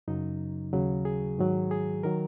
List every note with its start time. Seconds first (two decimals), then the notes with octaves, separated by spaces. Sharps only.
0.08 F#2 C#3 F#3 D#4
0.73 D#2 C#3 F#3
1.05 G#4
1.39 G#2 D#3 F#3
1.71 G#4
2.03 D#3 F#3 A#4